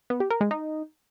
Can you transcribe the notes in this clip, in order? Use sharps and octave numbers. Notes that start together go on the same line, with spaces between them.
B3
G4
A#4
G#3
D#4